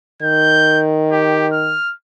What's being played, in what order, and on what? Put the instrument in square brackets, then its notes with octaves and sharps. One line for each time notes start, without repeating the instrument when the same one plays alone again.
[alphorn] D#3 [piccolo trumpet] G6
[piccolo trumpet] G4
F6